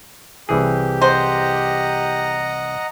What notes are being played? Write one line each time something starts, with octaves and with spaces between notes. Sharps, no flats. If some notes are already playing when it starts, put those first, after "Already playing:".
C2 E3 G4 G#4
C5 D#5 F#5 A#5